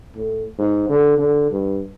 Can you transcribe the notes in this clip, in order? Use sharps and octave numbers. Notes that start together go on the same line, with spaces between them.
A2
G#2
D3
D3
G2